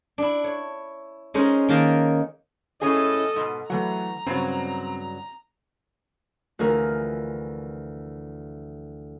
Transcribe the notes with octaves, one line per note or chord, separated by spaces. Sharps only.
D4 E4
C#5
G#3 C#4 D#4 A#4 C5
D#3 A#3 A#4 A5 A#5
A2 C#4 G#4 A4 D#5
G#2 B2
E3 F#3 A3 F#5 A#5
G2 C#3 F#3 C4
D2 E3 F3 G#4 A#4